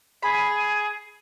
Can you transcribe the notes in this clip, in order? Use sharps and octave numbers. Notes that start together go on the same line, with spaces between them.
G#4 B5